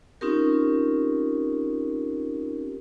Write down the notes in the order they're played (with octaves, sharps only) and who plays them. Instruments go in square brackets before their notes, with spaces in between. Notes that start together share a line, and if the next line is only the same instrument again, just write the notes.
[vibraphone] C4 C#4 D#4 F4 G4 A#4